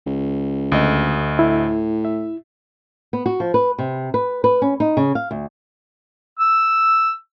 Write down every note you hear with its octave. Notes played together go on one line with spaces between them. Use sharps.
C#2
D2 D#5
A2 E4
E5
B3
F#4
F3
B4
C3
B4
B4
C#4
D#4
C#3
F5
D2
E6